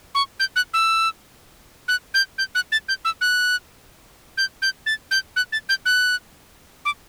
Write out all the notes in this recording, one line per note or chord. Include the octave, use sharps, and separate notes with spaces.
C#6
G6
F#6
E6
F#6
G6
G6
F#6
A6
G6
E6
F#6
G6
G6
A6
G6
F#6
A6
G6
F#6
D6